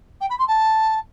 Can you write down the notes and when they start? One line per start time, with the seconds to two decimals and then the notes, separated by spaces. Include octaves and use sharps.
0.21 G5
0.30 B5
0.39 C6
0.48 A5